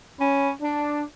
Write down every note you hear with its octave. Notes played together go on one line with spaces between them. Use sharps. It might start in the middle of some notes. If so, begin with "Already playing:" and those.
C#4 B5
D4